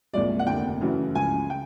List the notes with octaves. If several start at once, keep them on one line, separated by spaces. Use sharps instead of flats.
C2 A#2 F3 G#3 D5
F#5
F1 D#2 D3 G5
F#2 C#3 E3 A3
C#2 C#3 F3 G#5
C#3 G5